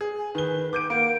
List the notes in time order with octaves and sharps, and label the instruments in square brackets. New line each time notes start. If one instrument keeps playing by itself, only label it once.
[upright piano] G#4
[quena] G#5
[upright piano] D#3 G7 [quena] B4
[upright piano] D6 G6 D7
[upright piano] A#3 [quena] F#5 [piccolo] D7